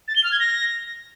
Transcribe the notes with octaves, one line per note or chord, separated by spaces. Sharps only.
A6
G7
F6
G#6
A#6